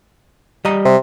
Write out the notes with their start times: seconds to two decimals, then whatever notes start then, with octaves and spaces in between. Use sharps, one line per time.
0.65 G3 D#5 A#5
0.85 C3